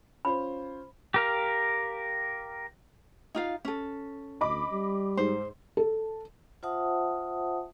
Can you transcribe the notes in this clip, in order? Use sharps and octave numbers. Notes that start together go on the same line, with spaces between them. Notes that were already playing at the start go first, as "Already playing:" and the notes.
C#4 F4 C5 B5
G4 A#4 F5
D#4 F4 F5
C#4 A4
D2 D#5 B5 D6
G3
G#2 C5
A4
F4 C5 E5 F#5 A5 D#6